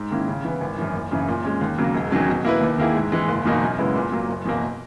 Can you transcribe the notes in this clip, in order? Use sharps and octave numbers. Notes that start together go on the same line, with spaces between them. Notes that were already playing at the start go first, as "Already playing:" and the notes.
Already playing: G#2
D#3 A#3 C#4 E4
C#3
E3 B3
G#1
F#2 E3
F#1
F#2 C#3 E3
A#2
G#3 C#4
D#2
C#3 F#3 A#3
E1
E2 D#3 F#3 C#4
B2
A#3 E4 B4
D#2
D#3 A#3 E4 G#4
G#2
E3 G#3
F#1
E2 B2 A#3 D#4
F#2
C#3 G#3 B3 E4
A#2
F#3 A#3
F#1
E2 B2 A#3